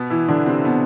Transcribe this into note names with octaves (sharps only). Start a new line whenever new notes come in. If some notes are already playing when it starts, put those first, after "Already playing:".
Already playing: B2 B3
E3 E4
D3 D4
C3 C4
B2 B3